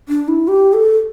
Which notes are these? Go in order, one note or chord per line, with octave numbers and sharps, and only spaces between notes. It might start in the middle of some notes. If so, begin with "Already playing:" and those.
D4
E4
G4
A4